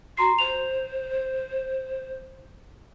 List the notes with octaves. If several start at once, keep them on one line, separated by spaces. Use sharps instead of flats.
F#4 A#5 C6 C7
C5 F7